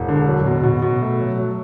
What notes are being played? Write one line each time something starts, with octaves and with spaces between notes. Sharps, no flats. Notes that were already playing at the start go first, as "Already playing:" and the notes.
Already playing: E1
D3
F#3
B2
B2
B2
A3
F#3
F#3